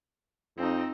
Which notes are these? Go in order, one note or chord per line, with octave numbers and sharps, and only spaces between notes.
F2 C4 D#4